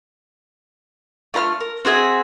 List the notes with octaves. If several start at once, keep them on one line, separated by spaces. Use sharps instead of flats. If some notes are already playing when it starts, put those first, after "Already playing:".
A3 F4 A#5 F6
A#4
C4 F#4 G#4 E5